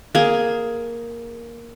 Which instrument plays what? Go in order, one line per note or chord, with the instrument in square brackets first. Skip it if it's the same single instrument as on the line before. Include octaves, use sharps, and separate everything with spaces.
[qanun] A#3 G#4